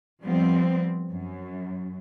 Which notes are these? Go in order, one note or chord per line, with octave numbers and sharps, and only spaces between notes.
F3 G3 B3 C4
F#2